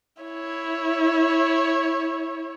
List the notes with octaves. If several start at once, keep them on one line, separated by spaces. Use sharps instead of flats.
E4 C#5